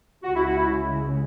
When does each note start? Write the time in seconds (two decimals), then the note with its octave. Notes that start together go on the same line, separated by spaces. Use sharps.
0.23 C#2 C#3 G#3 F#4
0.34 E4
0.46 F#4
0.57 E4